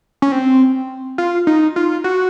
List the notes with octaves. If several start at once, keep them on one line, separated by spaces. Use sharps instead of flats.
C#4
C4
F4
D#4
F4
F#4